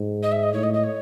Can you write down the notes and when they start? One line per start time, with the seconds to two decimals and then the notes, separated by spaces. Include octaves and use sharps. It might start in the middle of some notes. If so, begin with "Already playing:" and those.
Already playing: G#2
0.23 D#5
0.32 E5
0.43 D#5
0.53 A2 C#5
0.63 D#5
0.74 D#5
0.84 C#5